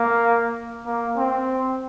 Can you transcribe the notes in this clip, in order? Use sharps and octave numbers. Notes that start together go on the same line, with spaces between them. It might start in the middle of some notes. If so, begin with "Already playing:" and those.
Already playing: A#3
A#3
C4